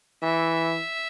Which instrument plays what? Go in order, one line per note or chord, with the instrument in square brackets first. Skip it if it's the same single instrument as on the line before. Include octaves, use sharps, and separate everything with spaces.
[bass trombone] E3 [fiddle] E5